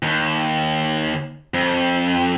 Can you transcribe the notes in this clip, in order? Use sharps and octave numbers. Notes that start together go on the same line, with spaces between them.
D#2
F2